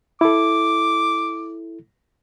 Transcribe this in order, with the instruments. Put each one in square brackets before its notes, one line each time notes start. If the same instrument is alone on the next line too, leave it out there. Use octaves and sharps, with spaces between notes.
[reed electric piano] E4 A4 [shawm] D6